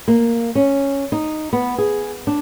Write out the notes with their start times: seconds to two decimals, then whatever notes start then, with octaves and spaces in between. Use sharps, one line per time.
0.08 A#3
0.55 C#4
1.12 D#4
1.53 B3
1.78 G#4
2.27 D4